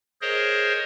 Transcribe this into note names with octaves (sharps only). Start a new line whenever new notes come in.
G#4 A#4 C5 C#5 D#5